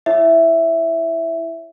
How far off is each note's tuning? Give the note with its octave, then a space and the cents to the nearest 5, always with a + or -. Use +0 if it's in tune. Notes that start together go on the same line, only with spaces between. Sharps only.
E4 +0 C#5 +0 E5 +5